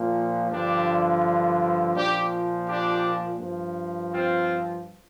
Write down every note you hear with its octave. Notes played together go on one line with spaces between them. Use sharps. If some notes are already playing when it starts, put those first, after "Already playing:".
Already playing: A#2 F3
G2 D3 F3 D4 G4
A#2 F3 D4 G4
D4 G4
G2 F3
C4 F4